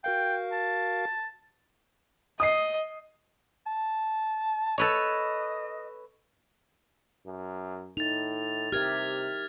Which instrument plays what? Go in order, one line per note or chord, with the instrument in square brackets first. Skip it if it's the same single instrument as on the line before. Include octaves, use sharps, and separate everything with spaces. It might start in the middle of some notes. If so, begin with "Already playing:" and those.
[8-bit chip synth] F#4 A#4 F5 [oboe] G5
[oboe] A5
[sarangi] D#5 [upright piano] D#6 C7
[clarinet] A5
[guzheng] A4 B4 C#5 [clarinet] D#5
[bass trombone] F#2
[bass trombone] A2 [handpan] D#4 [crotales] A6 F7
[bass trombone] C3 [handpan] G4 A#4 E5 [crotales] F6 G#6 A6